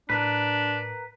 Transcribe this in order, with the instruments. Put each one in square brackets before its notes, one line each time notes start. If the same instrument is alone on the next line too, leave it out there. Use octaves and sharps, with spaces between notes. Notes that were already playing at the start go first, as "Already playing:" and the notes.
[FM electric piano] A2 [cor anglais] D4 [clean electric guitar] A#4 B4